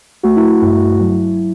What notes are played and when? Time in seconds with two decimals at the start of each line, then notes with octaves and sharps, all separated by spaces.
0.23 A3 F#4
0.36 E4
0.61 G2 E4
1.01 F#3